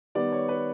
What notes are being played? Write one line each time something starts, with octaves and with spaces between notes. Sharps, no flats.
D#3 G3 B3 D5
C#5
B4